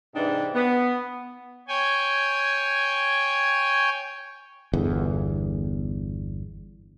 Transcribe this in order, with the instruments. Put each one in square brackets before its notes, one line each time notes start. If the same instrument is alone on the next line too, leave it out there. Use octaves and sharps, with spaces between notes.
[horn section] G#2 C3 E3 C4 D4 D#4
B3
[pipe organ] C#5 G5 G#5
[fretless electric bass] G1 E2